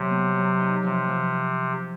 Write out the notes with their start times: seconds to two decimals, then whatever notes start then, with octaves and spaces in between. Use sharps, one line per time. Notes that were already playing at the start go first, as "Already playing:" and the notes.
Already playing: C3 F#3
0.10 B3
0.36 F#3
0.60 D#4
0.84 C3 F3
1.08 F3